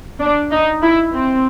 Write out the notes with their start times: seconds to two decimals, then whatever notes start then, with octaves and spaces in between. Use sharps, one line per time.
0.21 D4
0.51 D#4
0.82 E4
1.13 C4